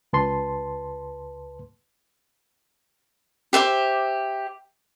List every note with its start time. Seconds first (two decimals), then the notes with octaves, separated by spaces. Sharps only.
0.13 C#2 B4 A5 C6
3.53 G4 C5 E5 D6